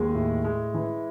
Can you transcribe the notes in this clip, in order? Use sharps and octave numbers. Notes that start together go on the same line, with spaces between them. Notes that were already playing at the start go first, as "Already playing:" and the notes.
Already playing: D#2 G#3 G#4
A2
G#3
E3